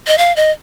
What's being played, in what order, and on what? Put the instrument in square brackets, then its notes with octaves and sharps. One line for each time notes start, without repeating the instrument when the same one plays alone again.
[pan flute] D#5
F5
D#5